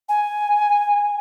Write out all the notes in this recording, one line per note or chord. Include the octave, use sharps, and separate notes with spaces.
G#5